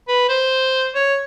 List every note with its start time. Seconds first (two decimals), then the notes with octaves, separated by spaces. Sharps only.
0.08 B4
0.29 C5
0.95 C#5